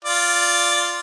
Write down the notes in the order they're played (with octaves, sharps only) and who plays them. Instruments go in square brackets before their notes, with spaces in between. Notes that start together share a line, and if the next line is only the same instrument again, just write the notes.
[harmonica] F4 D5